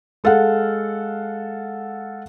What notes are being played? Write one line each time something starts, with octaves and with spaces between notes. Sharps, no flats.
G#3 A4 F5 F#5